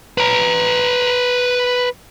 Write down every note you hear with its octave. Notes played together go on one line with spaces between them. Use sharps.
B4 A#5